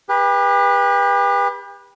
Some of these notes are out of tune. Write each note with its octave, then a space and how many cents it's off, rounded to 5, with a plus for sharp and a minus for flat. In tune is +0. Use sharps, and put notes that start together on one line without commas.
G4 +35 B4 -20